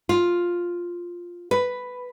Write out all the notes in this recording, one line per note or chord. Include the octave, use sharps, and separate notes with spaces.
F4
B4